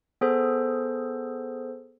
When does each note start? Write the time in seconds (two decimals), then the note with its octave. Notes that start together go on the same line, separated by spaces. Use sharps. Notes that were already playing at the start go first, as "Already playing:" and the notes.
0.21 B3 G#4 A4 C5